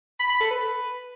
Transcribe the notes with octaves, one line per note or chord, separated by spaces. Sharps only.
B5
B5
A4
B4